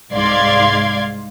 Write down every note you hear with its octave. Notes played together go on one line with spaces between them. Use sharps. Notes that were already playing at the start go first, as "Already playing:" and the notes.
C2 G#2 D5 F5 C6 G#6